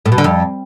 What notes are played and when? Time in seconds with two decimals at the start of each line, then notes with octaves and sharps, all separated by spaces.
0.06 A2
0.12 B2
0.18 D3
0.24 F2